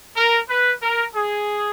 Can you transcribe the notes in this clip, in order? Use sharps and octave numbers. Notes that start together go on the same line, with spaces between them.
A#4
B4
A#4
G#4